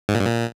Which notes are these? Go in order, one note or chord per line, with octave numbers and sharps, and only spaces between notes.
G#2
A#2
G2
A#2